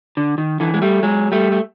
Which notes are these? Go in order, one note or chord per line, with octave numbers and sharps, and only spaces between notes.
D3
D#3
D3 E3
G#3
G3 A3
F#3 G#3
G3 A3
A3